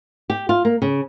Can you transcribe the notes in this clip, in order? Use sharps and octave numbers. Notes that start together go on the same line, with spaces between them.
G4
F4
A#3
C#3